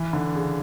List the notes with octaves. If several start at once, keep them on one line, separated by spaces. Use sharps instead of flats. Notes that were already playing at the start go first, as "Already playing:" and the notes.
Already playing: E3
D3
C#3